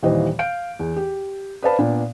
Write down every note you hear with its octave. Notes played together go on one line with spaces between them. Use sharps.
D#2 A#2 E3 G3 C5 D#5
F5 G6 D7
E2
G4
B4 C5 D5 F5 A5 B5
A#2 B3 D4